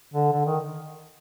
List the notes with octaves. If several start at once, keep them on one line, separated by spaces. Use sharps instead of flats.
D3
D3
D#3